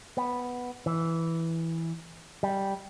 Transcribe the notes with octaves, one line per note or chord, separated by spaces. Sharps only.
B3
E3
G3